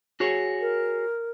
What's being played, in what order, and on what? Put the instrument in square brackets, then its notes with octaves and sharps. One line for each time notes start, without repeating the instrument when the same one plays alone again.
[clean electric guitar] F#4 G#4 C#5
[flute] A#4